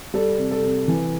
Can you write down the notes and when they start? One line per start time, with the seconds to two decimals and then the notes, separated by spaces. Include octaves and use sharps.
0.14 G3 A4
0.38 C3
0.51 A4
0.63 C3
0.88 E3